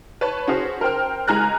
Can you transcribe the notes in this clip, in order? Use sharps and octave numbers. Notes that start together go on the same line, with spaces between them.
B4 C#5 A5
C#4 F#4 G#4 C5
A#4 C5 G5 F6
C#2 G#3 G#5 A#5 F6 F#6